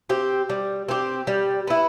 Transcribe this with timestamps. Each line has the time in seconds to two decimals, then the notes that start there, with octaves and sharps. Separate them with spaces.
0.09 C4 G4
0.50 G3
0.88 C4 G4
1.27 G3
1.67 B3 E4